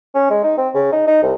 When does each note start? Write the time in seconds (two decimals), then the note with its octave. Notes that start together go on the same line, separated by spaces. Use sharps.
0.14 C#4
0.30 G#3
0.44 D#4
0.57 C4
0.74 C#3
0.92 D#4
1.07 D#4
1.22 C2